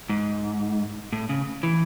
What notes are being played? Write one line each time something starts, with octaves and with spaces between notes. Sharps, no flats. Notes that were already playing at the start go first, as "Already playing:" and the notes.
G#2
A2
C#3
E3